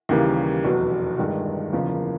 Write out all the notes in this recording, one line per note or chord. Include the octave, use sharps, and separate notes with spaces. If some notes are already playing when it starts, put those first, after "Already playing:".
D#2 C#3 E3 G3 A#3
F1 E2 B2 F#3
G1 G2 D#3 G#3
F#1 E2 C#3 F3 A#3